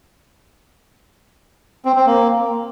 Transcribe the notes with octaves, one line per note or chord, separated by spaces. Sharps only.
C4
C4
A#3